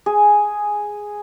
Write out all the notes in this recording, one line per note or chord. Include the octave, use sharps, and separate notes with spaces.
G#4